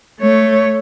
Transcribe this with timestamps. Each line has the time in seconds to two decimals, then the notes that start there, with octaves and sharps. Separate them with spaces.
0.21 A3 C#5